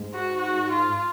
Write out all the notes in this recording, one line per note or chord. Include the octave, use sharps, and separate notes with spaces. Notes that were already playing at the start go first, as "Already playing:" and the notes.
Already playing: G#2
F#4
F#4
F4